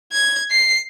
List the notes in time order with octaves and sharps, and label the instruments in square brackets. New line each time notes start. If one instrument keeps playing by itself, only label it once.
[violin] G#6
C7